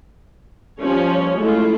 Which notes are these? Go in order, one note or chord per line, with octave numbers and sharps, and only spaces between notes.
F3 G3 C#4 C#5
G#3 A3 E4 F4